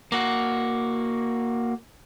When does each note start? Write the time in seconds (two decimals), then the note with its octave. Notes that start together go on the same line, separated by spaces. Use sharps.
0.12 A#3 F#4